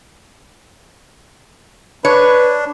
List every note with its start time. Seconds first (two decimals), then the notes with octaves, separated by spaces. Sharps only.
2.05 D4 B4 C#5